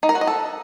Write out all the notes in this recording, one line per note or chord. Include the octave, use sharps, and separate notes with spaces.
D#4
A#4
F#4
D#5
A4